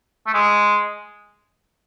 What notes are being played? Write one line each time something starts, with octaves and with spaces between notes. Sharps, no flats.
A3
G#3